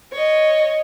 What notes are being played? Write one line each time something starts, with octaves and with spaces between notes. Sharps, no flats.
C#5 D#5